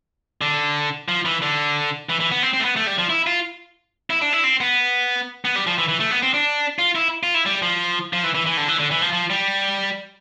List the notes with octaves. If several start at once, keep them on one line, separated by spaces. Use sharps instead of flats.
D3
F3
E3
D3
E3
E3
B3
C4
C4
A3
B3
A3
G3
F3
E4
F4
E4
D4
E4
C4
B3
B3
G3
F3
E3
E3
A3
B3
C4
D4
F4
E4
F4
E4
G3
F3
F3
E3
E3
E3
D3
E3
D3
E3
F3
F3
G3